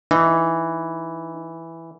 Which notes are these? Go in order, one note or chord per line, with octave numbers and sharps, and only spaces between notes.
E3 D#4